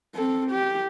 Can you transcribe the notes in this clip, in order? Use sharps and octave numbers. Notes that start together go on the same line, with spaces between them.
C4 A4
G4